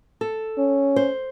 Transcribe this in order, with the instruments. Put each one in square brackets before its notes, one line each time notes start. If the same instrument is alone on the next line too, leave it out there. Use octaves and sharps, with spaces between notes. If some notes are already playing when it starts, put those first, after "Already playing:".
[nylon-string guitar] A4
[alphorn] C#4
[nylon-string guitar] C5